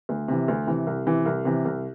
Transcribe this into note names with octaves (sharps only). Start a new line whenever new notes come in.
D2
C3 E3
D2
C3 E3
C2
C3 E3
C2
C3 E3
C2